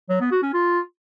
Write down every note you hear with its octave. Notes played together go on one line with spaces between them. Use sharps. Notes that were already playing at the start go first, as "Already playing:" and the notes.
F#3
B3
F#4
C#4
F4